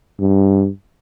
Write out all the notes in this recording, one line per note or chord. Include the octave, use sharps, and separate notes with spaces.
G2